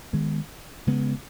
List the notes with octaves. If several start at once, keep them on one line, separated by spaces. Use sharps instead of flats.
D#3 G#3 B3
C#3 G#3 B3